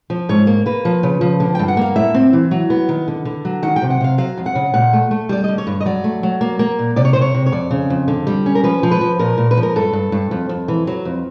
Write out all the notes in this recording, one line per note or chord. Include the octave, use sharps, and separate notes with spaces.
F3
G#2 C#5
A#3
A#3 B4
F3
C#3
F3
D3
G2 G5
F#5
A#3 F5
A2 E5
C4
E3
F#3
B3
D#3
D3
D3
F#3
D#3 F#5
G5
C3
F#5
C3 F5
F#3 F5
F2
F#5
C#3
A#2 F#5
A3
A3
G3 D5
D3 D#5
C#5
G2
D#5
F#3 D5
A3
F#3
A#3
A#3
A#2
C3 D5
C#5
C3 C5
C#5
C3
C#5
F2 D5
C#3
F2
D3
G3
C#4
A#4
F3 B4
F3
B4
F3
A#2 A#4
A#2
B4
F3
A#4
G2 A4
G2
G2
F2
F2
E3
F#3
F2